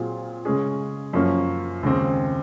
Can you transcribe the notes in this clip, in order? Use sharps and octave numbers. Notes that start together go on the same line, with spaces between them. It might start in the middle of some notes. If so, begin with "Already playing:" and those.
Already playing: A#2 F#3 C4 F4 G#4
C#3 G#3 C#4 G#4
F#2 F3 A#3 C#4
D#2 C#3 G#3 C4